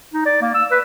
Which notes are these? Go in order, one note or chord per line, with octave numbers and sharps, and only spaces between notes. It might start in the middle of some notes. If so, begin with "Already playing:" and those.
D#4
D5
A#3
E6
B4